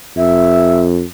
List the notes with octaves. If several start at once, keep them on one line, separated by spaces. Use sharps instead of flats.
F2 E5